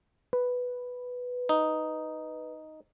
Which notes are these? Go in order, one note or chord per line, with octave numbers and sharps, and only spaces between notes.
B4
D#4